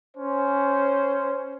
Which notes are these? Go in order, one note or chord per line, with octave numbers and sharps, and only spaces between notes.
C#4 C5